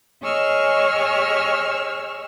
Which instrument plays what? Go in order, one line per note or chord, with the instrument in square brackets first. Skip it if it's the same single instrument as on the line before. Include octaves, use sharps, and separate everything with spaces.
[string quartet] G#4 C#5 D#5 C#6 E6 F6